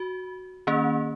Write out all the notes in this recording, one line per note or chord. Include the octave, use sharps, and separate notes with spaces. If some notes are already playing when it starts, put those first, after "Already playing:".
Already playing: F#4
D#3 A#3 C#4